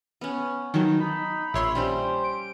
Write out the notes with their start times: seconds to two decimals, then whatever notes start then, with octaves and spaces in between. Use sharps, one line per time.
0.21 B3 C#4
0.74 D#3 F#3 D#4 A5
1.00 D#4 B5
1.54 A#1 C#5 E5 C6
1.75 G3 C#4 G4 C5
2.24 D7